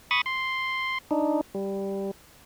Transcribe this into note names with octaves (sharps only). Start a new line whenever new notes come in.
B5 C#6 D#6 A6
C6
D4 D#4
G3